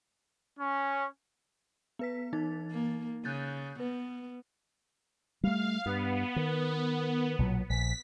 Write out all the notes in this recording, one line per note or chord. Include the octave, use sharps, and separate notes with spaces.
C#4
B3 B4 B6
E3 D#4 A6
A#3
C#3 F#6 G6 A6
B3 B4
G3 A3 F5
G2 B3
D#3
B1 A#2 F#3
A#1 B6